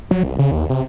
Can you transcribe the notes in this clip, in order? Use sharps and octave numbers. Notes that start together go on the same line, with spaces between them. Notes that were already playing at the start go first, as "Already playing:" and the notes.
F#3
C2
C#3
D#2
C3